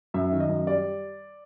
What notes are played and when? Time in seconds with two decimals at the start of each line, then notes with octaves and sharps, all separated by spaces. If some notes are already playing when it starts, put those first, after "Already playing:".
0.14 F#2 E5
0.32 D#3
0.40 D#5
0.49 F#2
0.67 G3 D5